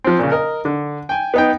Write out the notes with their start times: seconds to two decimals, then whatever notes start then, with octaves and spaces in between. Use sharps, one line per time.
0.04 F3 C4
0.19 A#2 C#3
0.32 A#4 D#5
0.65 D3
1.09 G5 G#5
1.34 B3 D#4 G5